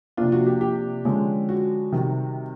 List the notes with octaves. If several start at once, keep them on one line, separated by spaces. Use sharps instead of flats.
C3 F3 A#3 D4 F4
F#4
G4
G4
D3 F3 G#3 C#4
F#4
C3 D#3 G3